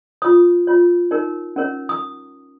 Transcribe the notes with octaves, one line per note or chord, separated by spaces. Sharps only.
F4 C#5 D#6
F4 C#5
D#4 A#4 C#5
C#4 A#4 C#5
D#6